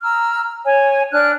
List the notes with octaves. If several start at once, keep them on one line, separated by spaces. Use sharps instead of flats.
A#5 E6 F6
C#5 G#5
D4 F6 F#6